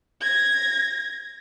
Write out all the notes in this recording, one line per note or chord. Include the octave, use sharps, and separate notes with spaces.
G#6 A#6